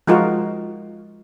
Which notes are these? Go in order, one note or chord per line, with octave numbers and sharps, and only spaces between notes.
F3 G#3 D#4 F4 F#4 A#4